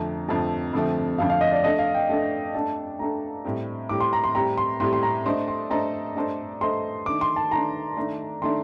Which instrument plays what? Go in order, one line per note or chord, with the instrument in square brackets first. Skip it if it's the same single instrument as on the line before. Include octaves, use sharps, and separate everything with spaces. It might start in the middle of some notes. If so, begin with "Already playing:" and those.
Already playing: [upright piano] F2 D3 F3 A3 C4 [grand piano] A#5
[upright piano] F2 D3 F3 A3 C4 [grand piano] A5
[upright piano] F2 D3 F3 A3 C4
[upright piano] F2 D3 F3 A3 C4 [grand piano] F5
[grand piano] F5
D#5
D5
[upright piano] A3 D4 A4 [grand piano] D#5
[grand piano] F5
G5
[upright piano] A3 D4 A4
[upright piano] A3 D4 A4 [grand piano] A5
[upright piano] A3 D4 A4 [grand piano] A#5
[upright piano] A2 G3 C4 G4
[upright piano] A2 G3 C4 G4 [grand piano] D6
[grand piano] C6
A#5
C6
[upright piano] A2 G3 C4 G4 [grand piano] A#5
[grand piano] C6
[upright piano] A2 G3 C4 G4 [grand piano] C6
[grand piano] C6
A#5
[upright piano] A3 D4 A4 C5 D#5 [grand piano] C6
[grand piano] C6
[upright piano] A3 D4 A4 C5 D#5 [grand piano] A#5
[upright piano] A3 D4 A4 C5 D#5
[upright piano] A3 D4 A4 C5 D#5 [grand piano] C6
[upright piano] D#3 A3 D4 [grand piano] D6
[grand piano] C6
A5
[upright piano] D#3 A3 D4 [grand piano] A#5
[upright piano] D#3 A3 D4
[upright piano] D#3 A3 D4 [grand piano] C6